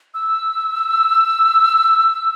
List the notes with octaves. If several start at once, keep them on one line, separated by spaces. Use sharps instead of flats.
E6